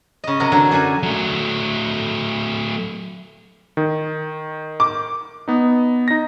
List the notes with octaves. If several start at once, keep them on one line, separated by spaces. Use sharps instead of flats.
C#3 D#5
C3 F#3 A#4 D#5
D3 E3 F#3 D4
F#2 D5 F#5 G#5
F#3 A3
D#3
D6
B3 D#4
D#4 A#6